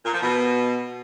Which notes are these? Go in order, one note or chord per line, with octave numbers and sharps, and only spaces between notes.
A#2
F3
B2